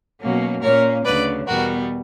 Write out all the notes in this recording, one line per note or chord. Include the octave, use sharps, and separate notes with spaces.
B2 F#3 A#3 C#4
A#2 A#3 C#4 A#4 C#5
D2 C#3 F#3 B4 D5
E2 B2 G3 B3 F#4 A#4